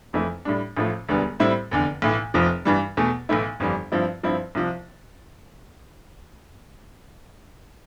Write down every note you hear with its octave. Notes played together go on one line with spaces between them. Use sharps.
F1 F2 E3 A3 E4
A2 G3 D4
A1 A2 F3 A3
E1 D2 D3 G3 B3
A2 G3 C4 E4
F1 E2 D3
B1 A2 E3
F1 F2 C3 F3
G2 E3 G3
E2 B2 A3
B1 A2 E3 A3 E4
G1 F2 E3 G3
G2 F3 C4 E4
G2 F3 C4 E4
C2 C3 F3